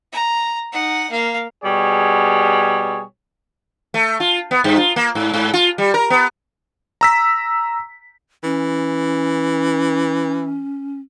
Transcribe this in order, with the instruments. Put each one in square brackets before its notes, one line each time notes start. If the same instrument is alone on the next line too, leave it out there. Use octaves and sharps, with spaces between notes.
[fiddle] A#5
D#4 F#5
A#3 F5
[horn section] B2 G3 G#4 C#5
[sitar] A3
F4
B3
G2
F4
A#3
G#2
G#2
F4
G3
A#4
B3
[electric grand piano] A#5 E6 B6
[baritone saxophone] E3 [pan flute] C#4